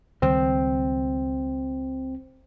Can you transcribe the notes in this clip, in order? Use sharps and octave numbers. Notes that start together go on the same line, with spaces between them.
C#2 D#3 G3 C4